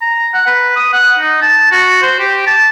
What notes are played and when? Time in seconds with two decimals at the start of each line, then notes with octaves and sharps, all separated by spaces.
0.02 A#5
0.34 F#5
0.47 B4
0.76 D#6
0.93 F#5
1.19 D#4
1.42 A5
1.72 F#4
2.02 C5
2.20 G4
2.47 A5